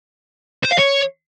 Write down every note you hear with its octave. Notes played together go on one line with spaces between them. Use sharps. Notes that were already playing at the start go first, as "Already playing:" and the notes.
C5
F5
C#5